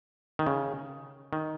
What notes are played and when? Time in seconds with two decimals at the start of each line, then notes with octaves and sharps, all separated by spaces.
0.39 D#3
0.47 C#3
1.33 D#3